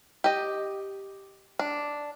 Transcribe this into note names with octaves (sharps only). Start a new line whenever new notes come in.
G4 D#5
D4